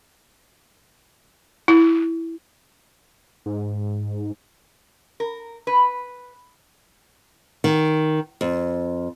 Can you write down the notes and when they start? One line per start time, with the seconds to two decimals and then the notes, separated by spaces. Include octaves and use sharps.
1.68 E4
3.46 G#2
5.20 A#4
5.67 B4
7.64 D#3
8.41 F2